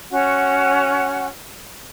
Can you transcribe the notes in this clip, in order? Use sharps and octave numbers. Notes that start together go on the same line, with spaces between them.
C#4 F#4 F#5